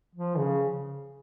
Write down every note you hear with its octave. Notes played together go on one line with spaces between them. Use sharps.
F3
C#3